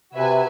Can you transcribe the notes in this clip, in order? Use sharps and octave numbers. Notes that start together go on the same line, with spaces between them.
C3 F#4 B4 E5 G#5